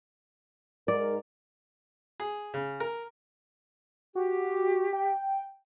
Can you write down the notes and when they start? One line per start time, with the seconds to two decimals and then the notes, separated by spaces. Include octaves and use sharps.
0.88 G#2 A#4 D5
2.20 G#4
2.54 C#3
2.80 A#4
4.15 F#4 G4
4.93 G5